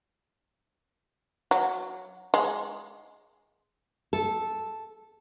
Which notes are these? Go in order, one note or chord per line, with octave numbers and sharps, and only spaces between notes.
F#3
G#3
A4